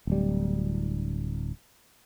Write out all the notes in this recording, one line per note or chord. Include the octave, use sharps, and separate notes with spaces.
D1 G3